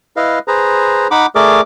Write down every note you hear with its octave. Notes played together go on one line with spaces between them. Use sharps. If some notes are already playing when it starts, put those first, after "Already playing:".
E4 B4 D#5 F5
G#4 B4 C5 A#5
D#4 F#5 B5 D6
A3 G#4 A#4 D5 D6